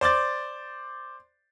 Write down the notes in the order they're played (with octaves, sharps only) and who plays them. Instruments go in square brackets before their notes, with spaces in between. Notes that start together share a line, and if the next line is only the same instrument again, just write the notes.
[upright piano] C5 D5 D6 A6